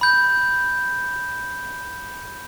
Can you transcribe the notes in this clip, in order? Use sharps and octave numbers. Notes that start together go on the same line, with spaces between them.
B5 G6